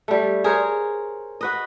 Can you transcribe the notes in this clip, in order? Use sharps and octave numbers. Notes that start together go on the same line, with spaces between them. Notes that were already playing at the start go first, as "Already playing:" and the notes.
G3 A3
G#4 A#4 C5 C#5
F#4 B4 D#5